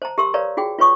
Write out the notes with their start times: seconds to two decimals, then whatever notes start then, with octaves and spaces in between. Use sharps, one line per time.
0.02 C5 A5 A#5
0.18 G4 A#4 C6 E6
0.34 A#4 B4 C#5 D5 F5 A#5
0.57 F4 F#4 G#4 G5
0.78 F4 B4 C#5 C#6 D#6